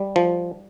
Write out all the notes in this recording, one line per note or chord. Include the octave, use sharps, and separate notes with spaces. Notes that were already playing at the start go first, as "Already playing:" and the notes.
Already playing: G3
F3